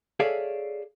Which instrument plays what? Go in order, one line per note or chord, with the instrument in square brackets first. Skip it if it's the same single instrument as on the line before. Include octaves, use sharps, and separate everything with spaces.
[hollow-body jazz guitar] G#4 A4 C#5 D5 E5 F5